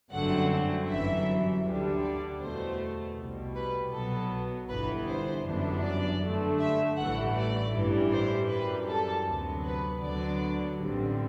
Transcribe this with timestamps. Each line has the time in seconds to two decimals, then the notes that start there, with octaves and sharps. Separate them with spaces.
0.11 G1 F#2 D3 A3 C4 F#5
0.87 G1 F#2 E3 E5
1.64 D2 D3 G3 D4
2.03 D5
2.40 E2 B2 A3 C5
3.16 C2 B2 G3
3.55 B4
3.93 B1 B2 F#3 B3 A4
4.69 G1 G2 E3 B3 B4
5.07 C5
5.45 G1 F#2 E3 B3 D4
5.83 D5
6.21 G2 D3 A3
6.59 E5
6.97 A1 G2 E3 A3 F#5
7.35 D5
7.73 A1 G2 E3 G3
8.12 C5
8.49 F#2 E3 G3 B4
8.88 A4
9.26 D2 C3 F#3 B3
9.64 B4
10.01 D2 D3 F#3 B3 D4 D5
10.78 A1 G2 D3 G3 C4